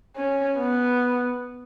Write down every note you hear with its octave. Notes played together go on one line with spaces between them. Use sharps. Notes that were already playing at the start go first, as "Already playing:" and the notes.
C#4
B3